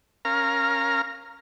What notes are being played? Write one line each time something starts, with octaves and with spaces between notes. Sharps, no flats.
C#4 A#4 F5 A#5 F6